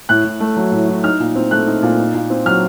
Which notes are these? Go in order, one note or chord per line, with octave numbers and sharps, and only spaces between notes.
A2 F#6
A2
A3
F#3
A2
A2
D#4 F6
A#2
C4
A3 F#6
D#4
A#2
D#4
A#2
C4
F#3 F6